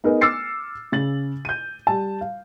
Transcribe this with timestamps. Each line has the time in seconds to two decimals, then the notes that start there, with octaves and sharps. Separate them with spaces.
0.04 B3 D#4 G#4 A#4 B4 D#5
0.21 D6 E6 F6 A6 C7 C#7
0.92 C#3 A6 F#7
1.45 G6 D#7
1.87 G3 A5
2.21 F5